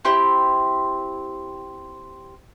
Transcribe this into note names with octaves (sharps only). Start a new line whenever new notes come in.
C4 E4 G4